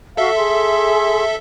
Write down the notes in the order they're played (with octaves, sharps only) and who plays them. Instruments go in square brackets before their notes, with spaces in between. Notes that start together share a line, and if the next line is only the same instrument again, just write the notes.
[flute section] F#4 F5 [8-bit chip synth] A4 E5
[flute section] G#4 C6